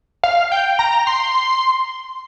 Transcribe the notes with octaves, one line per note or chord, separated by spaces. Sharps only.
F5
G5
A#5
C6